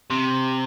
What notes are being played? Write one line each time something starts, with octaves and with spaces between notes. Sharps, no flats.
C3